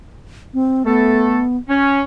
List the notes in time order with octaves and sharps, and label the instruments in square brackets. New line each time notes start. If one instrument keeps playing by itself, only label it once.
[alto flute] C4
[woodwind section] A3 A4 [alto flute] B3
[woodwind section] C#4